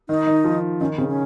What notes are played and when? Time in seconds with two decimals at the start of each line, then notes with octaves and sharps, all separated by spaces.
0.09 D#3 D#4
0.27 D#3
0.44 F3
0.80 D#3 C#4
0.98 C#3 C4
1.08 C#4